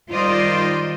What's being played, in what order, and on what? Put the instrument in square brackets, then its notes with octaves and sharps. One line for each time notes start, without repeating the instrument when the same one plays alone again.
[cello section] D#3 G3 F4 C5 D5 D#5